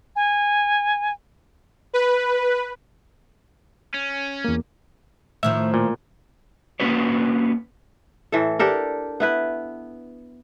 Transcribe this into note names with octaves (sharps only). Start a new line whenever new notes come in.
G#5
B4
C#4
E2 A#3
A2 D#3 F3 E5
A#2
A#3 B3 C#4 F#4 B4 C#5
A2 E3 A4
D4 G4 A4 A#4
B3 E4 B4